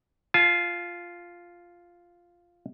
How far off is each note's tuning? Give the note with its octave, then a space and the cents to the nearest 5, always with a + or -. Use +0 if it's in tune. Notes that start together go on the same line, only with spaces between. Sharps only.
F4 +0 A5 -45